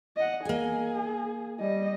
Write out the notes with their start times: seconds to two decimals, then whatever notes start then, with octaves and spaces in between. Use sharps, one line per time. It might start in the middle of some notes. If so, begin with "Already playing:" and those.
0.16 D#5 F#5
0.45 A#3 G#4 G#5
1.60 G3 D#5